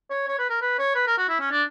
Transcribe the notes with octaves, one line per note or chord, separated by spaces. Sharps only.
C#5
C#5
B4
A#4
B4
C#5
B4
A#4
F#4
E4
C#4
D4